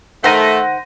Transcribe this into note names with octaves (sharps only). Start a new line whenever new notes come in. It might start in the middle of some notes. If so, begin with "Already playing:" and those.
D#3 A3 C5 F#5 A#6 D#7